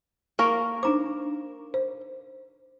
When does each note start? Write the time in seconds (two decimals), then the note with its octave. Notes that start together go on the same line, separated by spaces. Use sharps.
0.39 A#3 A#4 C#6
0.83 D4 D#4 C5 A#5 D6
1.74 C5